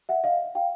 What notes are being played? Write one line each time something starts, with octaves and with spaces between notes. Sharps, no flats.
E5 F#5
D#5 F5
F5 G5